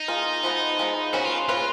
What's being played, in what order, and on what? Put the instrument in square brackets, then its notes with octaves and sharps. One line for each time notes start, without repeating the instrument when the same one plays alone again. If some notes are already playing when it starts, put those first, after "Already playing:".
Already playing: [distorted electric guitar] D#4
[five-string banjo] A#3 F4 G#4
F3 G#3 B3
F3 G#3 B3
[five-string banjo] F3 A#3 C#4 G#4 B4 [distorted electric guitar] F#4
[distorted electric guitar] F4
[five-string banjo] F3 A#3 C#4 G#4 B4 [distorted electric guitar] F4